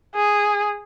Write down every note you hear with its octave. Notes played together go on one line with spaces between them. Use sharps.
G#4